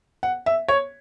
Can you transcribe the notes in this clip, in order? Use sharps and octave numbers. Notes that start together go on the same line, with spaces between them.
F#5
E5
C#5